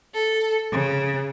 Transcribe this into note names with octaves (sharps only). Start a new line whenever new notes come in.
A4
C#3